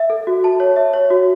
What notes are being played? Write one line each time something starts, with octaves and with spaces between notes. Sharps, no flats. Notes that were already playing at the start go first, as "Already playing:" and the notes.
Already playing: E5
A4
F#4
A5
C#5
E5
C#5
F#4